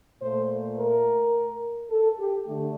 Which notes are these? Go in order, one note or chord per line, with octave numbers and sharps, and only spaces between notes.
A#2 A3 C5
A#4
A4
G4
D3 A3